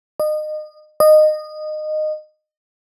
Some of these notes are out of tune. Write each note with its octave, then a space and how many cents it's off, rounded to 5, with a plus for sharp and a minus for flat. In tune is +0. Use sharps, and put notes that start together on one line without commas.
D#5 -30
D#5 -20